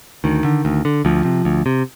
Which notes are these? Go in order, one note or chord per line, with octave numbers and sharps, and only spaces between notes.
D2 D#3
D3
D2
D3
D2 F3
C3
D2
C3